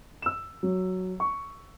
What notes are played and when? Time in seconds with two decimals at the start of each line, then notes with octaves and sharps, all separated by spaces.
0.22 E6 E7
0.63 F#3
1.20 C#6